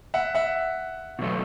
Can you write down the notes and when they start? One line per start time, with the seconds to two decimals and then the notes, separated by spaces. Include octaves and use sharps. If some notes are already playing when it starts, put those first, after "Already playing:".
0.14 E5 F#5
0.35 E5 F#5
1.19 B2 F#3 A3